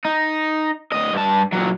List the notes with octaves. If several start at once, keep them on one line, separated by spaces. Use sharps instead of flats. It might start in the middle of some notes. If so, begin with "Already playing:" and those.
D#4
D2 D#5
G2 A5
A#2 F#3